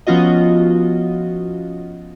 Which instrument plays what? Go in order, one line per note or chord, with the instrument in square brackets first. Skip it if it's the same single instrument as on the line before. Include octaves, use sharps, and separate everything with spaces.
[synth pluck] F3 B3 C#4 F4 F#4 D#5